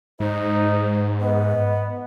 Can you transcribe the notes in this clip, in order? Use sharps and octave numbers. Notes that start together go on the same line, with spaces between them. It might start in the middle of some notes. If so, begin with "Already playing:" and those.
G#2 D#4 C5
B3 D#5